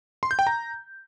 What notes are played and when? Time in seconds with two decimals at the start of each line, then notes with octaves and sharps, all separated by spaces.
0.23 C6
0.31 G6
0.39 G5
0.47 A#5